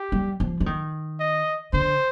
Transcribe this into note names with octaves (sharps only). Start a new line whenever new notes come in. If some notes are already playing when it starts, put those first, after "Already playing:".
Already playing: G4
G3
F3
F3
D#3
D#5
D3 C5